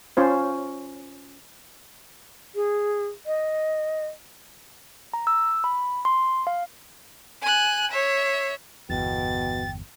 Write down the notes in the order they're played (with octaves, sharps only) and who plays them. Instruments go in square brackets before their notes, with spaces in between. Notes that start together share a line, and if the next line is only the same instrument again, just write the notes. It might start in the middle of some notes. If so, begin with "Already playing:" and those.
[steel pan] C#4 F4 C5
[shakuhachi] G#4
D#5
[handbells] A#5
E6
B5
C6
F5
[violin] G#5 F#6
C#5 E5
[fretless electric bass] G1 E2 [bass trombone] B2 [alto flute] G5 [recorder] A6